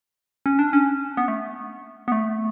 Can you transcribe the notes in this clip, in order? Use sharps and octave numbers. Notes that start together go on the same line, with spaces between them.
C#4
D4
C#4
B3
A3
B3
A3